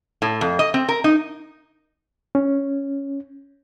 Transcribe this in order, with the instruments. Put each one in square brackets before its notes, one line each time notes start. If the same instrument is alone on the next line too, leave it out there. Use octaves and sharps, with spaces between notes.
[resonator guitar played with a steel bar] A2
F2
D#5
C4
A#4
D#4
[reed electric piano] C#4